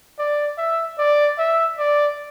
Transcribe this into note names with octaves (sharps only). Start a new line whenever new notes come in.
D5
E5
D5
E5
D5